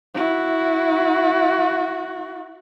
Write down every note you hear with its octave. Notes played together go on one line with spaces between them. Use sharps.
E4 F#4